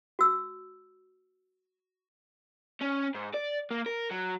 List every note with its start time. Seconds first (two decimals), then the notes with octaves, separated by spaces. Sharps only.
0.19 F#4 E6
2.81 C#4
3.15 G#2
3.34 D5
3.71 A#3
3.86 A#4
4.11 F#3